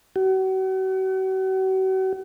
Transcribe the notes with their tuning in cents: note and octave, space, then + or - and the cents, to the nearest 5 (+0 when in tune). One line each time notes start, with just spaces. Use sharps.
F#4 +40